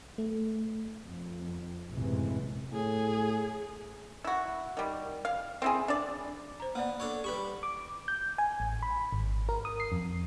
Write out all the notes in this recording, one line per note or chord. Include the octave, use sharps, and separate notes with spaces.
A3
F2
A#1 F#2 A2 C3 E3 G#3
A2 G#4
E4 F#4
D#3 G3
F5
C4 E4 G#4
D4 D5
C5 A#5
A#3 B3 D5
D4 A4 C#5
G3 G4 B4 B5 C#6
D6
G6
G#5
A1
B5
G#1
A#4
D#6
C7
F2